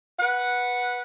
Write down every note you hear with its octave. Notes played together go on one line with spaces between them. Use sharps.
B4 F#5